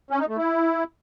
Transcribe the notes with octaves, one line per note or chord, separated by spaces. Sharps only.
C#4
D#4
A3
E4